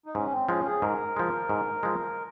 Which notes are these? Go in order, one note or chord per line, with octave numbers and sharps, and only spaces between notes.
D#4
G#2 C#4
C4
F3 G#3 C#4
G#4
G#2 A#4
F3 G#3
G#2
F3 G#3